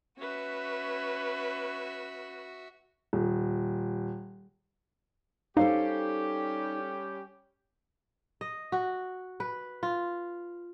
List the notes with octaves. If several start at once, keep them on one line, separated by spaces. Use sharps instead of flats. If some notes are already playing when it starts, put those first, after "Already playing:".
C#4 F#4 B4 E5
D#1
G3 C#4 D#4 G4 A4 C5 F5
D#5
F#4
B4
F4